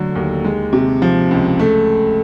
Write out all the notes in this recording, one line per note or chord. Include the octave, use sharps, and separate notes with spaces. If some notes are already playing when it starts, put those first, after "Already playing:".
Already playing: D3 F#3 A3
D#2
G#3
C3
F3
C#2
A3